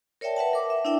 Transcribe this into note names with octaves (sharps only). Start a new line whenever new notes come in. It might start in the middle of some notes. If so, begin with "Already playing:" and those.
A#4 C#5 D5 E5 G5 A5
B4 E5 F#5 A5
A#4 D6
E5
D4 E4 D5 E5 G5